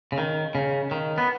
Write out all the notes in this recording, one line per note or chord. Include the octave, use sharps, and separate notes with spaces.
C#3
D#3
C#3
D#3
B3